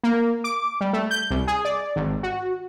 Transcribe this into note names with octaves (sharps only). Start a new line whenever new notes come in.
A#3
D6
G3
A3
G6
C2
G#4
D5
G#1
F#4